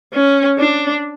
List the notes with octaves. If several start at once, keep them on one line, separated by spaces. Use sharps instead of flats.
C#4
D4